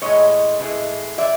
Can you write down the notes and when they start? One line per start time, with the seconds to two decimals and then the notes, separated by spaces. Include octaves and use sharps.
0.02 A2 E3 G#3 C#5 D#5
0.60 A2 E3 G#3
1.18 E3 G#3 D5 E5